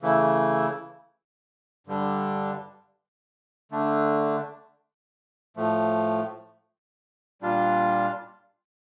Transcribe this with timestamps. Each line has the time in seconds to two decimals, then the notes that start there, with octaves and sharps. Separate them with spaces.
0.02 C#3 E3 A3 E4
1.87 G2 D3 G3 D4
3.71 D3 A3 D4
5.56 A2 F3 A3
7.42 A#2 G3 D4 F4